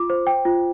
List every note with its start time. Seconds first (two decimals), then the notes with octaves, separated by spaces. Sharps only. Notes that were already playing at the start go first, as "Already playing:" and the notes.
Already playing: F4 D6
0.10 C5
0.27 G5
0.45 F4